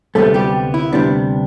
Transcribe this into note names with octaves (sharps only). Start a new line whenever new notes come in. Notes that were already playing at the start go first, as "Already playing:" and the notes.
D2 C3 G3 A3 B3 A4
G3 G4
E4
D2 C3 G3 B3 D4